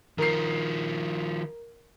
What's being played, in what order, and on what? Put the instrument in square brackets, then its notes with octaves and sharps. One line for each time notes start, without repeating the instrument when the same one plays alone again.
[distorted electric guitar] D#3 F3 [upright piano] A#4 C7